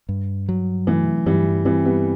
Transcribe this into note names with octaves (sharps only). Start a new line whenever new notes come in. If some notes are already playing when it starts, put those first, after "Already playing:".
G2
F#3
E3 A3
G2 E3 G3
E3 G3 C4
G3 B3